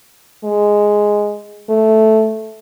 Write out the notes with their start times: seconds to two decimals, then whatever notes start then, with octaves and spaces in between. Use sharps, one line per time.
0.44 G#3
1.69 A3